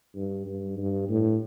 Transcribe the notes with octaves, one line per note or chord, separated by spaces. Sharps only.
G2
G2
G2
A2